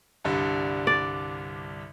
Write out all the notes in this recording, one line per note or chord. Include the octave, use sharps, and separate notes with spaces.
C2 G2 D3
D5